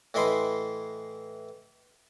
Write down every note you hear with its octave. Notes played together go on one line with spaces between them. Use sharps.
A2 E3 E4 D#5 B5 C6